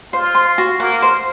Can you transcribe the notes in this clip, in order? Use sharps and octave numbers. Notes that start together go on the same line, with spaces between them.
F4 C5
C6
F#4
A#3 F#5
C5